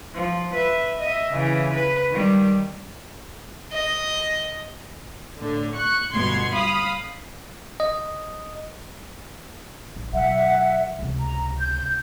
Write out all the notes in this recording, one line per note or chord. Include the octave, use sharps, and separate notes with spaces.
F3
B4 E5
D#5 E5
C#3 E3
B4
D#3 G3
D#5
A2 D3
C#6 F#6
G1 B2 C6 G#6
F5 B5 D#6
D#5
A1
B2 F#3 E5 F#5
C#2 C3
A#5
G6